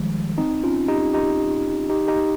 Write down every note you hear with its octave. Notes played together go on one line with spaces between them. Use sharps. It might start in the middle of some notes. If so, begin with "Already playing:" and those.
Already playing: D#3 F3 G3 G#3
C4 D#4
C#4 F4
D#4 G4
D#4 G4
D#4 G4
D#4 G4